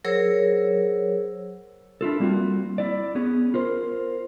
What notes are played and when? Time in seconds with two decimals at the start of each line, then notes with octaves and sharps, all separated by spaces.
0.05 F#3 G#4 A#4 C5 C#5 E6
2.01 D4 E4 F4 A4
2.20 G3 A#3 C4 F4 F#4
2.78 E4 D5
3.15 B3 C#4 G#4
3.54 F4 A#4 C5